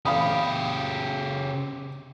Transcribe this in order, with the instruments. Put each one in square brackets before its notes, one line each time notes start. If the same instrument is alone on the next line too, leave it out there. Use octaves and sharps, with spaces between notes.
[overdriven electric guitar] C#3 G4 [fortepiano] F5 B5 D#6